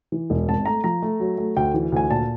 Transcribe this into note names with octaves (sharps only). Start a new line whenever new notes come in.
E3
E1
G#1 A5
A3 A#5
F3 A#5
A3
F#3
A3
D2 G5
E3
D2 G#5
A#2 A5